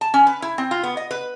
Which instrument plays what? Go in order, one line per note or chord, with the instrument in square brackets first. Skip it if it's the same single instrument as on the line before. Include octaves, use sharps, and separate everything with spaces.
[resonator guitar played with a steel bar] A5
C#4
B4
E4
C4
F4
B3
D#5
B4